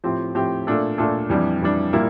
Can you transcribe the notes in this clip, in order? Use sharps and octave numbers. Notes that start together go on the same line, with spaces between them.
A2 F3 C4 G4
A2 F3 C4 G4
A#2 A3 D4 A4
A#2 A3 D4 A4
F2 E3 G3 D4
F2 E3 G3 D4
A#2 G3 A#3 E4